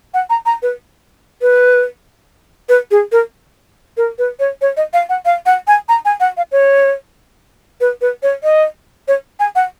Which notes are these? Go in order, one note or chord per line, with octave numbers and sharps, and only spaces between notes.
F#5
A#5
A#5
B4
B4
B4
G#4
A#4
A#4
B4
C#5
C#5
D#5
F5
F#5
F5
F#5
G#5
A#5
G#5
F#5
F5
C#5
B4
B4
C#5
D#5
C#5
G#5
F#5